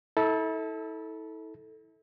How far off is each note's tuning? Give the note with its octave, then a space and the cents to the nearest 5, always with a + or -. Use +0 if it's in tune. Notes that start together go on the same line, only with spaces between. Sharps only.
E4 -35 A4 +0